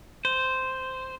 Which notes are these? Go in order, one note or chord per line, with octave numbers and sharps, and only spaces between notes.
C5